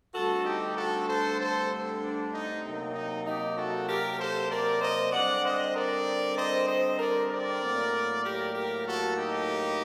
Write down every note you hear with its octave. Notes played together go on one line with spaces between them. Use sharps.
G2 D3 A3 C4 F#4 A4
D#4 G4
F#4 A4
A4 C5
A4 C5
D4
D#4
C3 F#3 A#3 D#4
D#4
D#4 G4
F#4 A4
G4 A#4
A4 C5
A#4 D5
C5 D#5
D3 G3 C4 D5 F#5
C5 D#5
A#4 D5
C5 D#5
C5 D#5
A#4 D5
A#4 D5
A2 F#3 A#3
G4 A#4
G4 A#4
F#4 A4
D#4 G4